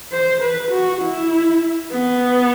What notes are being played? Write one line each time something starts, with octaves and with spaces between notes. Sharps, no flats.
C5
B4
F#4
E4
B3